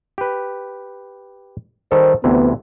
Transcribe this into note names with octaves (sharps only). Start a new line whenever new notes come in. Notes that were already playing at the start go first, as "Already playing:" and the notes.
G4 B4
D#3 G3 A4 C5
D2 C3 E3 B3